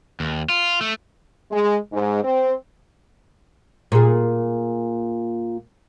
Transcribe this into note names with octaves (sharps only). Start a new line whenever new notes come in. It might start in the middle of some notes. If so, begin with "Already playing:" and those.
D#2
F4
A3
G#3
G#2
C4
A#2 G#4